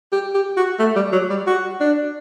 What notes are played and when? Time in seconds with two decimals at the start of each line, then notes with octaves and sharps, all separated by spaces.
0.12 G4
0.35 G4
0.57 F#4
0.79 A3
0.96 G3
1.12 F#3
1.30 G3
1.47 F#4
1.80 D4